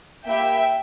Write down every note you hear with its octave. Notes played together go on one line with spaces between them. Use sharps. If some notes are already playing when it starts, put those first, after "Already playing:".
A#3 E4 G4 E5 G5